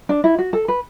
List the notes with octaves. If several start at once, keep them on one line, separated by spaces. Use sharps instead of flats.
D4
E4
F#4
A4
B4